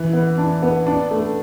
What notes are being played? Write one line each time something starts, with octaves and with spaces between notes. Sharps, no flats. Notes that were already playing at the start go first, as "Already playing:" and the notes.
Already playing: E3
B3
D4
B3
D4
A3